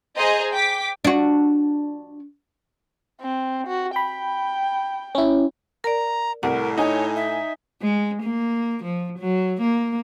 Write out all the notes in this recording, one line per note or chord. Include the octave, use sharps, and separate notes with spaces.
G#4 C5 D#5 A#5
G5 D6 B6
D4 F#4
C4
F#4
G5 B5
C#4 E4
A#4 D5 A#5
C2 A2 A#4 F#5
D#4 C#5 G#5
E5
G#3
A#3
F3
F#3
A#3